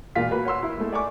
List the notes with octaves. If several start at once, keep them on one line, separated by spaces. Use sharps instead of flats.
E1 A#2 F4 B6
A#3 F#4 B4
C#5 F#5 C6 E6
E4
G#3 A3
D5 G#5 C#6 D6